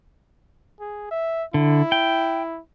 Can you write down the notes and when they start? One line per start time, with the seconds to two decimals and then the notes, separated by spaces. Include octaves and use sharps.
0.80 G#4
1.11 E5
1.54 D3 E4
1.92 G5